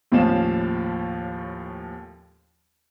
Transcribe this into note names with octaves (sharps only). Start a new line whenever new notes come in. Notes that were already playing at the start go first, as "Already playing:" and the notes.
D#2 A2 F3 C#4 F5 E7